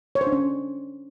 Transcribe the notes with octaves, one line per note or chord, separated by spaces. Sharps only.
C#5
C5
D4
C#4